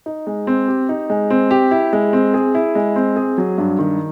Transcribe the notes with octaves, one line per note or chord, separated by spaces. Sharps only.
D#4
G#3
C4
G4
D#4
G#3
C4
G4
E4
G#3
C4
G#4
E4
G#3
C4
G#4
F#3
G2
D#3